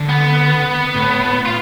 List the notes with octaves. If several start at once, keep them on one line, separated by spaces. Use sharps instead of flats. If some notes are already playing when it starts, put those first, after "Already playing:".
Already playing: D3
B3
A2
F4